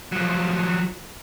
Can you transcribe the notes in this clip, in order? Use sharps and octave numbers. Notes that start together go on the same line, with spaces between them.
F3 F#3